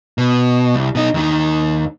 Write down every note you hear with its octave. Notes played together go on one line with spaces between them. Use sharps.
B2
C2
B2 D#4
D#2 D#3